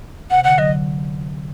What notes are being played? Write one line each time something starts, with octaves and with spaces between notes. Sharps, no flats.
C3 F#5
D3 F#5
D3 F#3 D#5